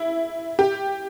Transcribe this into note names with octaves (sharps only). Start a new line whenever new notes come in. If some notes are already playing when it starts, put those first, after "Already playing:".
Already playing: E4
G4